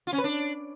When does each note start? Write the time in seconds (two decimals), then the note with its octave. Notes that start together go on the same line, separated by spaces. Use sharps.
0.07 F4
0.13 C#4
0.18 B4
0.24 D4